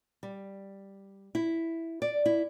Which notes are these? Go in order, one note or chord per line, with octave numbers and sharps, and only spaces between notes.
G3
E4
D5
E4